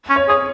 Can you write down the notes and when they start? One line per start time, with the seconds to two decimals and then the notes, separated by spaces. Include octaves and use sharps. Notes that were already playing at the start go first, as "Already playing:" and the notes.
0.10 C#4
0.16 C#5
0.28 G#4 C#5